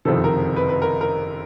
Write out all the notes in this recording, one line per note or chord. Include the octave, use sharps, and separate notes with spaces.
F#1 F2 C3 D#3 A4
A#4
B4
B4
A#4
A#4